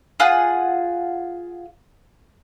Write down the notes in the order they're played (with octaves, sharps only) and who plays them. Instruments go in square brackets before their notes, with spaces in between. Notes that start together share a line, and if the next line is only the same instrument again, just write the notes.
[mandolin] F4 G#4 F#5